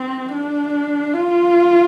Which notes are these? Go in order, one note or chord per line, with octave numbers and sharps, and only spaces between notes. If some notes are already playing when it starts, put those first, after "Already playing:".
Already playing: C4
D4
F4